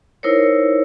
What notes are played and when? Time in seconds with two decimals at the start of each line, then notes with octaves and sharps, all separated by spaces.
0.23 D#4 E4 A#4 C5 C#5